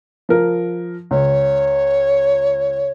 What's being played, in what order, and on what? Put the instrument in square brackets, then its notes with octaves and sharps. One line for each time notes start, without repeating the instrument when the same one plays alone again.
[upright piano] F3 A#4
[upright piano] C#2 [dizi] C#5